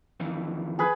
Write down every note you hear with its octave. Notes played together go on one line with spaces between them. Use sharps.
F2 D#3 E3
G#4 B4